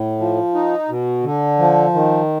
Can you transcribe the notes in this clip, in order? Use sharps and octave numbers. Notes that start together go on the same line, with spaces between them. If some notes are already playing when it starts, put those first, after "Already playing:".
Already playing: A2
F3
D#4
B2
D3
F3
D#3